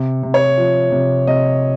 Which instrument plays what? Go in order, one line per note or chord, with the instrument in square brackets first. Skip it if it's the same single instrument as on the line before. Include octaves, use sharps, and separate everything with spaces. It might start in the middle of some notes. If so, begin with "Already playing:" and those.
Already playing: [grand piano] C3
C3
C#5
F3
C3
C3 D#5